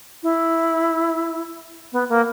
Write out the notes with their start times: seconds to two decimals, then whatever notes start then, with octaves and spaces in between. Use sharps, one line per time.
0.23 E4
1.92 B3
2.09 A#3